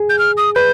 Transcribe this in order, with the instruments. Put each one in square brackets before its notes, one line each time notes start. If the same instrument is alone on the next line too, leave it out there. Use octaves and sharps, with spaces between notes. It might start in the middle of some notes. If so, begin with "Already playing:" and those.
Already playing: [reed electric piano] G#4
[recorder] G6
F6
D#6
[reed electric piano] B4 [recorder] G6